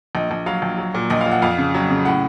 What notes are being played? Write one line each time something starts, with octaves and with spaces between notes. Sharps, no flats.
A#1 D#5
A#1
F#3 F5
A#1
F#3
A#2
A#1 D#5
F5
A#2
F#5
F2 F5
C#3
F#3
C#3
A2 F#5